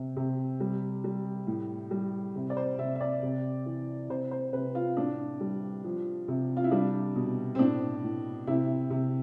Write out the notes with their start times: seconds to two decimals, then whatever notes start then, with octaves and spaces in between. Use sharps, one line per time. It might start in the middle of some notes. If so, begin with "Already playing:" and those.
Already playing: C3
0.16 C3
0.60 G3
1.04 G3
1.47 A2
1.91 G3
2.35 C3
2.50 D5
2.57 C5
2.78 C3 E5
2.95 E5
3.00 D5
3.23 C3
3.66 E3
4.09 C3 C5
4.31 C5
4.53 C3 B4
4.75 F4
4.97 A2 D4
5.41 G3
5.84 F3
6.28 C3
6.57 F4
6.64 E4
6.71 G3 D4
7.15 B2
7.55 C4
7.59 A2 D4
8.04 A2
8.47 C3 E4
8.90 C3